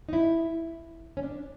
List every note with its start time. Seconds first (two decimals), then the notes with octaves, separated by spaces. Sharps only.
0.09 D#4
0.13 E4
1.17 C#4
1.23 D4